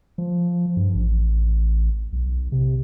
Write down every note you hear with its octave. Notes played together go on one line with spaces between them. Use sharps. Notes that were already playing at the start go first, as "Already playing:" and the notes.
F3
G2
A1
B1
C3